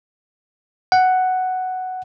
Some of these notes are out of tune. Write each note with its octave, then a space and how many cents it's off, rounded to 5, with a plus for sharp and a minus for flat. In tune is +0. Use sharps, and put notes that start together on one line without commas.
F#5 +5